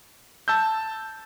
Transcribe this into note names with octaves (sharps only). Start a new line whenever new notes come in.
A5 E6 G6